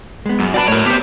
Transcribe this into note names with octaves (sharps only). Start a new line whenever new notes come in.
G#3 B3
F#2
F#4 B4 D5 G5 A5
A2 A3 A#4 C#5
B3 G4 C5